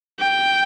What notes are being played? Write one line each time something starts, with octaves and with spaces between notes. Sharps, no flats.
G5